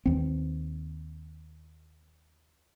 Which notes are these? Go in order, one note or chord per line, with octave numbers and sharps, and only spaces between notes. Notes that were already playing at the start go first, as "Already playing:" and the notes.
D#2 C4